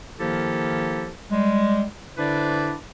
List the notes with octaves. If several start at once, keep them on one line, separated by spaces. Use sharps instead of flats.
D#3 F3 A#3 E4 G4 A4
G3 G#3
D3 D4 E4 B4 C5 D5